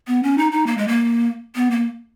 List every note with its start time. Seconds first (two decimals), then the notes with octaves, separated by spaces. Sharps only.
0.07 B3
0.23 C#4
0.38 D#4
0.52 D#4
0.67 A#3
0.78 G#3
0.88 A#3
1.56 B3
1.71 A#3